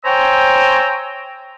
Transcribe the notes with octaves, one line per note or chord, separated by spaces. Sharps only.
C5 C#5 G5 G#5 A#5 E6